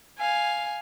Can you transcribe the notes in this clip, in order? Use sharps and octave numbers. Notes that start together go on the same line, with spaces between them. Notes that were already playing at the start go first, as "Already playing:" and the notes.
F5 G#5